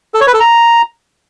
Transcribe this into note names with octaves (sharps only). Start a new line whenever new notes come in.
A4
C#5
B4
A4
A#5